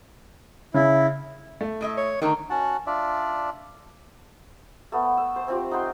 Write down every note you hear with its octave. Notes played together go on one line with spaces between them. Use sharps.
C#3 E4
A3
A2 D#5 E5
C#5
D3 D#3 A3 A#4
C#4 F#4 F#5 A5
D4 F4 D5 E5
A3 B3
E6
C5
C4 F4 G4
D#4 F#5 G5 C6